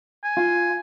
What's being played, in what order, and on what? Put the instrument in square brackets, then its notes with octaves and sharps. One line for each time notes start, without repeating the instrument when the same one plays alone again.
[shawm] G#5
[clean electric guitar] F4